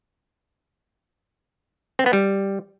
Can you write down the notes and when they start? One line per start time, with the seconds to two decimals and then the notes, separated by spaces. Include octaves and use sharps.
1.99 C4
2.06 B3
2.13 G3